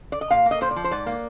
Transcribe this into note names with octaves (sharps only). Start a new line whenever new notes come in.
D5
D#5
A#2 F5
A#3
D#5
A#2 C5
D5
F3
C5
G#2 D5
A#3